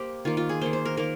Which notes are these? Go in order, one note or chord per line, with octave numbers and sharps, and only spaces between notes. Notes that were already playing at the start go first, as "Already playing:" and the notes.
Already playing: A#3 G4 C5
D#3 A#3 F4
F4
G#4
D#3 A#3 C5
C5
A#4
D#3 A#3 A#4